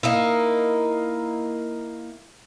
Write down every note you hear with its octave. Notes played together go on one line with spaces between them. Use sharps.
A#3 D#4 E4